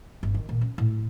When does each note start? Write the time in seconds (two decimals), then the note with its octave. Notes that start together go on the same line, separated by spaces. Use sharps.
0.23 G1
0.34 D#3
0.49 A#2
0.61 C#4
0.78 A2